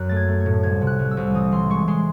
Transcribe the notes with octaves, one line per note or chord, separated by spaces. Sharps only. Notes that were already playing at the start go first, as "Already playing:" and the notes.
Already playing: F#2 F#6
A3 A6
G#6
A3
G#6
A2
C2 G#6
C3
F#6
C2
E6
C2
E3 D#6
E3 C6
G#3 C#6
G#3 C6